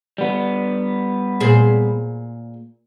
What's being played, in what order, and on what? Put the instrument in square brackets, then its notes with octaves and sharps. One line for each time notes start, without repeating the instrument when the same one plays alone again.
[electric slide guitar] G3 B3
[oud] A#2 G#4 C5